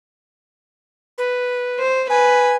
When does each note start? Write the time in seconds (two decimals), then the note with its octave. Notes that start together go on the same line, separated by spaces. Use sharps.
1.18 B4
1.79 C5
2.10 B4 G#5